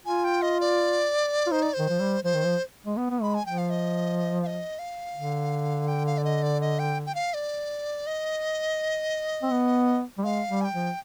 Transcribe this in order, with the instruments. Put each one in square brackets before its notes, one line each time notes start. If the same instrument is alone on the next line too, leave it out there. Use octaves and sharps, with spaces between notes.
[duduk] F4 [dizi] G#5
[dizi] G5
D#5
D5
[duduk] F4
[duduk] D#4 [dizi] C5
[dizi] D5
C5
[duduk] D#3
F3
G3
[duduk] F3 [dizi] C5
[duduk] D#3
F3
G#3
B3
B3
[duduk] G#3 [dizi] B5
[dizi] G#5
[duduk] F3 [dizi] G5
[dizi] F5
D#5
F5
D#5
F5
[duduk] D3
[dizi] G5
F5
D5
D#5
D5
D#5
G5
G5
F5
D5
D#5
[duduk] C4
B3
G3
[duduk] G#3 [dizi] F5
[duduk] G3
[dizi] G#5
G5
[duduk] F3